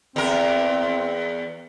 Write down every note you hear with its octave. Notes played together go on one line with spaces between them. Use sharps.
E2 C4 A#4